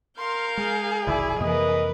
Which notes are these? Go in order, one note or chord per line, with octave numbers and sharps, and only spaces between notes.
A#4 F5 C6 G6
G#3 G#4
F1 B1 D#3 E4 D5
F2 C3 E3 A#3 A#4 B4 D#5